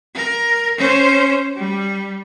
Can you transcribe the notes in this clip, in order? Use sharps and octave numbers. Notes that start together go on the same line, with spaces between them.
A#4
C#4 C5
G3